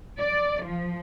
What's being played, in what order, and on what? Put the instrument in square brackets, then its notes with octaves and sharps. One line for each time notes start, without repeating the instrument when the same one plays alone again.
[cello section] D5
F3